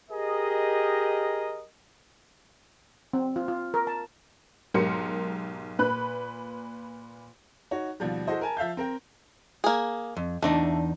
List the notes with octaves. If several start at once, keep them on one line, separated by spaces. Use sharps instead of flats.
G4 G#4 A#4 D#5
C4
F4
F4
A#4
A5
B1 G#2 G4 A#4 C6 C#7
A#2 B4 B5 F#6
D#4 F#4 C#5
D#2 B2 F3 G3
E4 F#4 G#4 A4 C5 D#5
A#4 G#5 A5
F3 E5 F5 G6
C4 A#4 G5
A#3 G#4
F2
E2 A3 D4 D#4